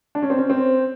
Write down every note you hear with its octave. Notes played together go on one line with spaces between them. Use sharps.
D4
C#4
C4
C#4
C4